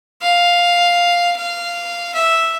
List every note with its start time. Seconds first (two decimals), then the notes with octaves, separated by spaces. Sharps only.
0.22 F5
1.37 F5
2.14 E5